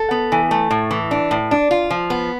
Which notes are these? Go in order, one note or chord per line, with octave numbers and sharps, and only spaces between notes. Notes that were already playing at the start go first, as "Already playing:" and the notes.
Already playing: A4
B3
E3
A3
A2
E3
D4
A2
D4
F4
F3
B3